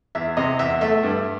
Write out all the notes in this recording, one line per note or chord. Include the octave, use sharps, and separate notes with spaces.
E2 E5
C3 D#5
E2 E5
A3 E5
G2